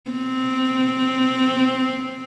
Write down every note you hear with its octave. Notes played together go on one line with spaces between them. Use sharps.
C4